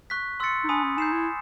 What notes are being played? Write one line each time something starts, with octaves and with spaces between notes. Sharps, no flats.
C#6 F#6 B6
C6 E6 A6 C#7
D#4
D4 G#5 B5 D#6
C#4
D#4 G6 C7 E7
E4